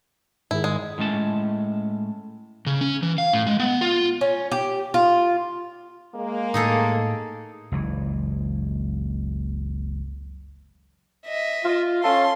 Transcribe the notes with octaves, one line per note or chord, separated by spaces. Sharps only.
G#2 D#3 E4 G#4
G#3
A2 G#3 C#4 A5
C#3
C#4
E3
F5
A2
G#3
B3
F4
C#4
G4
F4
G#3 A#3
A2 D#4 G#4 A4
F#1 C#2 E3
D#5 E5
F4
C#4 F4 A4 C6